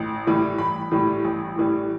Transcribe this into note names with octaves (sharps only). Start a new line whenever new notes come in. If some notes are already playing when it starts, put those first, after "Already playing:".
Already playing: A1
A2 E3 G3
A1 B5
A2 E3 G3
A1
A2 E3 G3